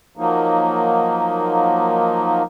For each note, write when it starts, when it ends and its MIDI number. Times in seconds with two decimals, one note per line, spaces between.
0.17 2.42 53
0.17 2.42 54
0.17 2.42 58
0.17 2.42 63